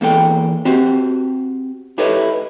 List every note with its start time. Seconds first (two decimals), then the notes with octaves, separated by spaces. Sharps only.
0.01 E2 A#3 A4 G5
0.65 C4 F#4 G4
1.98 E4 G4 A4 B4 C#5 D#5